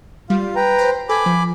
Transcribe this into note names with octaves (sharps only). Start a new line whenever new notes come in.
G3 F4 F5
B4 G5 A#5
C5
A4 G#5 B5 D6
F3